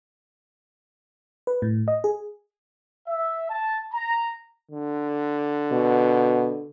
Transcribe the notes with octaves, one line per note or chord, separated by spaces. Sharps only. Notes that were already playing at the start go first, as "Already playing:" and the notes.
B4
A2
D#5
G#4
E5
A5
A#5
D3
B2